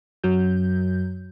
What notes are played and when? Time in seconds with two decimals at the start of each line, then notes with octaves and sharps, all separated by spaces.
0.24 F#2 F#3 G6